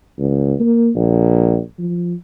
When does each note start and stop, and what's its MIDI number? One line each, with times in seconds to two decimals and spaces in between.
0.18 0.54 37
0.60 0.90 58
0.95 1.58 34
1.78 2.14 53